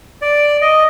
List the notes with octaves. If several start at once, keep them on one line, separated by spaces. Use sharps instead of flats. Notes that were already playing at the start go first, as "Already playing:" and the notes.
D5
D#5